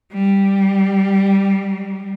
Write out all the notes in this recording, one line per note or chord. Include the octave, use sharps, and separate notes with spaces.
G3